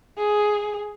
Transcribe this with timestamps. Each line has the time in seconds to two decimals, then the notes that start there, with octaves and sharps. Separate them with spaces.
0.18 G#4